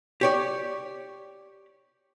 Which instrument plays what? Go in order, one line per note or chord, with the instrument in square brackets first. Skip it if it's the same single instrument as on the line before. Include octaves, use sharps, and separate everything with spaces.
[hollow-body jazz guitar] G4 C#5 D5